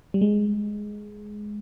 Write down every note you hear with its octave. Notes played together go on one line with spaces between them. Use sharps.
G3
G#3